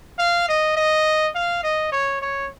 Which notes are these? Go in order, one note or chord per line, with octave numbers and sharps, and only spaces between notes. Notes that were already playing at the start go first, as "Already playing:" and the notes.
F5
D#5
D#5
F5
D#5
C#5
C#5